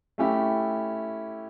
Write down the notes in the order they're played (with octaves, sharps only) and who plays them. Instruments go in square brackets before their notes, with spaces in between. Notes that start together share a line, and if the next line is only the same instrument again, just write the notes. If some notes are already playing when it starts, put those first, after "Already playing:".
[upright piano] A3 C#4 E4 G4